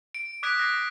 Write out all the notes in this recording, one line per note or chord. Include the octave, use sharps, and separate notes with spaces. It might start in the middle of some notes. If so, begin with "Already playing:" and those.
D7
D6 D#6 F#6 G#6 B6 D7
A#6 C7